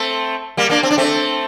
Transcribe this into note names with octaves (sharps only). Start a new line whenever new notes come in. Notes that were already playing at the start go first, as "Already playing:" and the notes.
Already playing: A3 C4
G3 A#3
A#3 D4
C4
D4
A3 C4